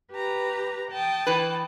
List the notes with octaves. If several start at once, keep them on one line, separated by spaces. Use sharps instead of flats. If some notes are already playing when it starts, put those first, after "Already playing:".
G4 B4 A#5
G5 A5 D#6
E3 B4